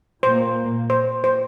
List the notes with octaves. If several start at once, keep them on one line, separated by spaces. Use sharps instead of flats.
A#2 A#3 C5
C5
C5